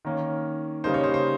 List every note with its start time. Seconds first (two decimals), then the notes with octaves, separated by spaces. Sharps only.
0.05 D#3 A#3 C#4
0.84 C#3 G3 A#3 D#4 C5
0.94 C#5
1.04 C5
1.14 C5